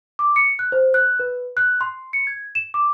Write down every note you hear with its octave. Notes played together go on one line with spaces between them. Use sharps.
D6
C#7
F#6
C5
F#6
B4
F#6
C6
C#7
G#6
E7
D6